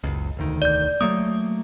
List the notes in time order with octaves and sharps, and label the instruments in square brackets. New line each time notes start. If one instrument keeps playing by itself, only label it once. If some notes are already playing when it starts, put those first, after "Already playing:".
[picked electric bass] F#1 C#2
E1 D2 D#3
[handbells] D5 G6
[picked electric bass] F#3 A3 A#3 [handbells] D#6